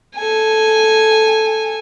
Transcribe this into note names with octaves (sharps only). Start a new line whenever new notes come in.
A4 G#5